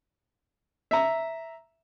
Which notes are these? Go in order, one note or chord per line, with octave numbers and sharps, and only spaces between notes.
E5 A#5